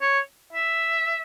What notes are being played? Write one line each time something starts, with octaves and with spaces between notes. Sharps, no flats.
C#5
E5